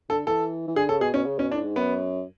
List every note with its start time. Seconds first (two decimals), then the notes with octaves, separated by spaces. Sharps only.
0.09 D3 A4
0.27 E3 A4
0.68 E3
0.76 D3 G#4
0.88 C#3 A4
1.01 B2 G#4
1.13 B2 C#4
1.26 C#3
1.38 B2 C#4
1.51 A2 D4
1.64 G#2
1.76 F#2 B3